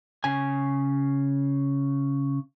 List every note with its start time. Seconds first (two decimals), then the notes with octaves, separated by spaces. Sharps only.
0.24 C#3 G#5